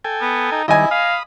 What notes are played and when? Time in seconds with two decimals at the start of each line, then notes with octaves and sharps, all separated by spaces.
0.04 A4 G5 G#5
0.21 B3
0.52 D#4
0.68 D#3 G3 E4 D#5 G#5
0.91 F5 B5 D#6